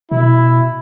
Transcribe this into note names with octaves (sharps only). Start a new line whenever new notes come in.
B2 E4